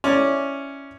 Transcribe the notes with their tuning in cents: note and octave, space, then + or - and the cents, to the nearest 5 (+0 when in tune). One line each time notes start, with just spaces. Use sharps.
C#4 +0 E4 +0 D5 +0